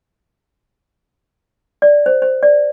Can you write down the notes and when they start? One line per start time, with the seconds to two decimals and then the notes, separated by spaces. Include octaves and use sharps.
1.82 D5
2.06 C5
2.22 C5
2.43 D5